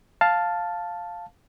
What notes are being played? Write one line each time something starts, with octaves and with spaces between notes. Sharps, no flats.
F5 A5